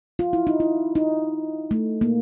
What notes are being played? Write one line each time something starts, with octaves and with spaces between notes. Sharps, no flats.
F4
E4
D#4
E4
D#4
A3
A#3